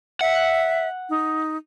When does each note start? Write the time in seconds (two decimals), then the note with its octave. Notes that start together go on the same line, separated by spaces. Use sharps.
0.21 E5 F#5
1.09 D#4